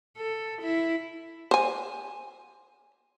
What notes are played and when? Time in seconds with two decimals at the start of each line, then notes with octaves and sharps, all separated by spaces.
0.17 A4
0.62 E4
1.51 C5 G#5